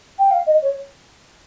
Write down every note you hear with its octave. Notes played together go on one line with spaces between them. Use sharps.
G5
F5
D#5
C#5